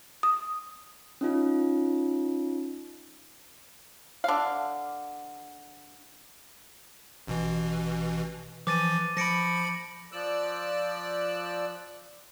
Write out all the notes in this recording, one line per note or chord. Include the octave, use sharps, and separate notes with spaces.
D#6
C#4 D#4 F4
D3 F5
A1 B2 E3
E3 F3 D6 A6 D#7
F3 B5 A#6 C#7 D7
F3 D5 E6 F#6